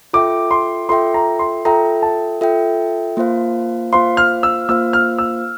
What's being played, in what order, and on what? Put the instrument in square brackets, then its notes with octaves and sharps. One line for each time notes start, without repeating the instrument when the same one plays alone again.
[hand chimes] F4 A4 E5 G5 [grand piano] D6
[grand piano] C6
[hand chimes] F4 A4 E5 G5 [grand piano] C6
[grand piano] A#5
C6
[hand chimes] F4 A4 E5 G5 [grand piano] A#5
[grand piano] A5
[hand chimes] F4 A4 E5 G5
A#3 F4 C5 F5
[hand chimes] A#3 F4 C5 F5 [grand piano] C6
[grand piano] F6
E6
[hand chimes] A#3 F4 C5 F5 [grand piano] E6
[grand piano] F6
E6